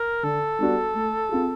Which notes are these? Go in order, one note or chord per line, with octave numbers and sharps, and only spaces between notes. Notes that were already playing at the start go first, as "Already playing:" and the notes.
Already playing: A#4
D3 A4
G3 B3 D4 F#4
A3
C4 F4 G#4